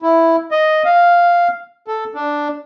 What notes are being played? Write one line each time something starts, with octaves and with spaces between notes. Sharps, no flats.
E4
D#5
F5
A4
D4